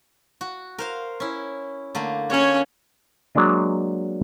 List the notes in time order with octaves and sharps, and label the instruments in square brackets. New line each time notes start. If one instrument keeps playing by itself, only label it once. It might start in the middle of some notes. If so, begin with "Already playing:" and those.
[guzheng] F#4
A#4 C5 F5
C#4 E4
D3 A3 A#3
[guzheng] A#3 F#4 [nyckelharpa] C#4 C#5
[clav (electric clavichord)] F#3 G#3 A#3 D4 D#5